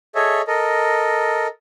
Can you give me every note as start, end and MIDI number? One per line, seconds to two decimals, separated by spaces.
0.15 0.42 68
0.15 0.42 69
0.15 0.42 73
0.15 0.42 75
0.15 0.42 76
0.47 1.47 69
0.47 1.47 70
0.47 1.47 75